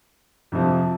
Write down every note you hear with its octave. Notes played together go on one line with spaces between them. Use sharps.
F2 C3 F3